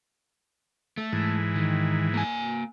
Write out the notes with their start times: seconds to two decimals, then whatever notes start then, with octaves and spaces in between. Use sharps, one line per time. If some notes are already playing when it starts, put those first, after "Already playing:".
0.98 A3
1.13 G#2 E3
1.56 D#3
2.14 A#3 G#5